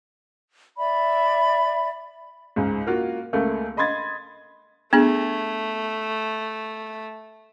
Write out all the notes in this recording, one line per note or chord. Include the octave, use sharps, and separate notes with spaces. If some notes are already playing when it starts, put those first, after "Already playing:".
D5 E5 B5
C#2 G#2
A#3 F4 F#4
C#2 A3 A#3
D#5 B5 C6 G#6 A6
A3 B3 D4 G#4